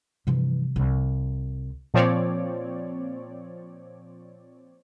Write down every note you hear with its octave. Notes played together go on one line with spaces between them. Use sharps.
G2 C3 E3 F3 G3
C2
A#2 F3 C4 C#5 D5